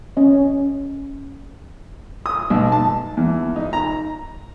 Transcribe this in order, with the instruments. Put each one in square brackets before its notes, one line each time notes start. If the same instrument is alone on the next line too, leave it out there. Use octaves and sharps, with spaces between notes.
[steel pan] C#4 D#5
[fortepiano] D#6
B1
A5
E2
D#4
A#5